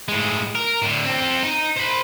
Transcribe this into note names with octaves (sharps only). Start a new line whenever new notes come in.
A2 G#3
A#4
A2 D3
C4 A4
D#4
C5 B5